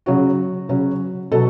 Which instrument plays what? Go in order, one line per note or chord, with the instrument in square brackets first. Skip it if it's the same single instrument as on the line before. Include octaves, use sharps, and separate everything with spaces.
[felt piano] C#3 F#3 C#4 F#4
C#3 F#3 C#4
B2 F#3 A4